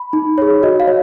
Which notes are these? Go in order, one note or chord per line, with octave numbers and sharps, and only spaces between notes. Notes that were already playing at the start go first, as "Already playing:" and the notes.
Already playing: B5
D#4
G#4 C#5
F#4 D#5
F5
C#5